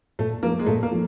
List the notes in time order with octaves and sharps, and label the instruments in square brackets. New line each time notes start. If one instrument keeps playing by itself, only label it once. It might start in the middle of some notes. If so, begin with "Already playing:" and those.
[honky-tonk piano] A#2 [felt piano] A3
[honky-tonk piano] F3 [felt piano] A#3
[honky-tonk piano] A3
[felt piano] G#3
[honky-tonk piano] A#2 [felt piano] A3
[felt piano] A#3
[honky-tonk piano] F3 A3